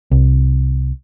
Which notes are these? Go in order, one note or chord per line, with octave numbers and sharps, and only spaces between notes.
C2